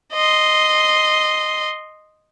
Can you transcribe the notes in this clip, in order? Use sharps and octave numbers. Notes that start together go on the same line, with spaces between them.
D#5 C6